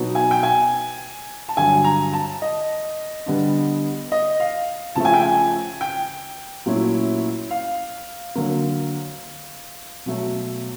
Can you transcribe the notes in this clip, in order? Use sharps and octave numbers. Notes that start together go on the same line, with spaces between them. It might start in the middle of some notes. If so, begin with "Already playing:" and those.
Already playing: B2 F#3 B3 D#4
G#5
G5
G#5
A5
G2 D3 F#3 G#5
A#5
A5
D#5
D3 G3 B3 D4
D#5
F5
C#3 F3 A3 A5
G#5
G5
G#5
G5
A#2 F#3 A3 C#4 E4
F5
D3 F#3 A#3
B2 F#3 A3